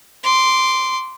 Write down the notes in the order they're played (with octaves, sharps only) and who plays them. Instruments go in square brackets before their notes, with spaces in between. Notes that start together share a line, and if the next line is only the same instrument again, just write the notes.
[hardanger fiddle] C6 D6